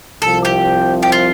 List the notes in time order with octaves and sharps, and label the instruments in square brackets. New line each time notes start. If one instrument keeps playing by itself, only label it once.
[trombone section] C2 C3 F3 [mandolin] A4
[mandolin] G4
G4
F4